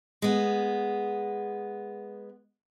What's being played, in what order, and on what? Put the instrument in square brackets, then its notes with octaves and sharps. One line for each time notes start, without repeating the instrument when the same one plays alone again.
[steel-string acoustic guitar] G#3 B3